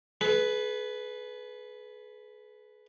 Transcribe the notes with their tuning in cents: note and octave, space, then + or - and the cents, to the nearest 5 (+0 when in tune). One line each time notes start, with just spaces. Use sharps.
G#4 +40 B4 +0